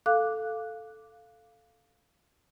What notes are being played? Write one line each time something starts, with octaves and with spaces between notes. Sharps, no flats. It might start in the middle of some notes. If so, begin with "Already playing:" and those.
A4 F5 D6 F#6